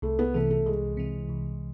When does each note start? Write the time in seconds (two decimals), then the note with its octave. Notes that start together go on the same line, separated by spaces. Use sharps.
0.02 C2 A3
0.19 B3
0.34 C3 E3 A3
0.51 A3
0.66 C2 G#3
0.97 C3 E3
1.29 C2